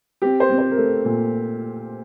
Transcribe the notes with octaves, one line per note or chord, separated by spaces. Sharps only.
C4 G4
C5
C4
C5
A#4
A3 A4
A#2